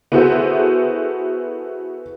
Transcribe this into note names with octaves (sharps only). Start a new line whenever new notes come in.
B3 E4 F#4 G#4 A4 C5